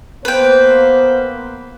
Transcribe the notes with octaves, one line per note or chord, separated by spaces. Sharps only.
A#3 B3 B4 C5 G5